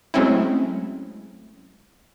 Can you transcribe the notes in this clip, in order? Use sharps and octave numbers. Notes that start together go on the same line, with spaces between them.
F#3 G#3 A3 C4 C#4 E4